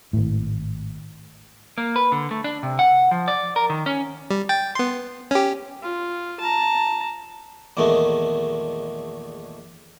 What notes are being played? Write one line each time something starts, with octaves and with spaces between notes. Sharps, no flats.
G#1 A2
A#3
B4
D3
A3
D4
C3
F#5
F3
D5
A#4
D#3
C#4
G3
G5 A6
B3 C6
C#4 G4
F4
A5 A#5
A#1 E2 D#3 G#3 A3